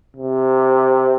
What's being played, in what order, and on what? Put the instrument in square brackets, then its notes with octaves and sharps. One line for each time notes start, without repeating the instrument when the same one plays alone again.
[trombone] C3